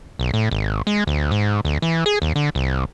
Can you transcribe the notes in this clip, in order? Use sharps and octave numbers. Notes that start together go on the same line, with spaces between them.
B1
A2
G#1
G#3
D2
G#2
D2
E3
G#4
D#2
D3
C2